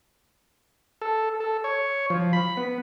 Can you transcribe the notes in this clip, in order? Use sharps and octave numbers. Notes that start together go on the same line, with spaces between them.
A4
A4
C#5
F3
B5
B3